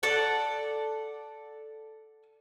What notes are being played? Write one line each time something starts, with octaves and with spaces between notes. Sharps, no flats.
A4 D5 F#5